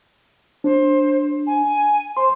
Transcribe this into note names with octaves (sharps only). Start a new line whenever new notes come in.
D4 C5
G#5
C5 C6